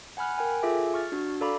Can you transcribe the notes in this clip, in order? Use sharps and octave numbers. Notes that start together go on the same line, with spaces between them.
F#5 G#5 B5 F6 F#6
A#4 G5 G#5
F4 G#4 A4 E5 G#5 D6
C#6 F6 A6
D4 F#4
A4 D5 F5 A#5 B5 D6